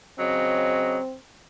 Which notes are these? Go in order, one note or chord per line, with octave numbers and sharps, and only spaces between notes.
C#3 F#3 C4 D#5